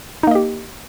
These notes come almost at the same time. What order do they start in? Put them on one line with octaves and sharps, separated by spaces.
D#4 A#3 D#5 G4